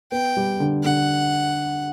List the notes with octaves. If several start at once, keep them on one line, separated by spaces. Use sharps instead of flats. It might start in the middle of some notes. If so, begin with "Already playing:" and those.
B3 G5
G3
D3
D3 F#5